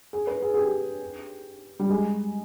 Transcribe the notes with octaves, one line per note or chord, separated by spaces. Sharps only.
G#4
B4
G#4
G#4
G4
G3
G#3